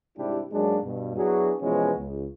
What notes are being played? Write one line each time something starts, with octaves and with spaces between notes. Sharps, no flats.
G#2 C3 G3 D4 E4 G4
G#2 F#3 G#3 A#3 D4 G#4
G2 B2
F#3 B3 D4 E4 F#4 G#4
B2 E3 F3 G#3 B3 C#4
C#2